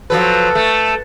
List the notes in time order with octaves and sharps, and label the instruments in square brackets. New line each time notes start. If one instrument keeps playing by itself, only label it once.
[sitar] F3 F#3 B4 [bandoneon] A4
[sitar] A3